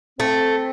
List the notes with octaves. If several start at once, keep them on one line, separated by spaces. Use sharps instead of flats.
A3 C4